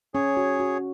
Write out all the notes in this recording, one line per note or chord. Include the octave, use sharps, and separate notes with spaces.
C#4 G#4 C#5
F#4
F#4